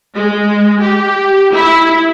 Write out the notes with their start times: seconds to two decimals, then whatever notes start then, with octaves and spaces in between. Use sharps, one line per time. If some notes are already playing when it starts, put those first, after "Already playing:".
0.15 G#3
0.81 G4
1.52 E4